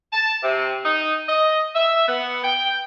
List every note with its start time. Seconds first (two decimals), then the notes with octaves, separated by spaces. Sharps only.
0.13 A5
0.44 C3
0.85 D#4
1.28 D#5
1.75 E5
2.07 B3
2.44 G5